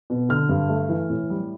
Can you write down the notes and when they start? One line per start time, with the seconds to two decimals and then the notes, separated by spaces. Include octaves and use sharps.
0.10 B2
0.29 D3 F6
0.49 G2
0.69 A3
0.89 E3
1.10 A2
1.30 G3